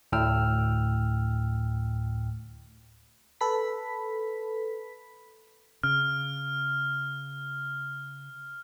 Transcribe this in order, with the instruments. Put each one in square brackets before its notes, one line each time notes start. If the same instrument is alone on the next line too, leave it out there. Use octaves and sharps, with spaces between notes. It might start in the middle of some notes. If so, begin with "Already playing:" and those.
[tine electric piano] D2 A2 G5 E6 F6
[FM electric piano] A4 B4 B5 B6
[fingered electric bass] C#3 [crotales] F6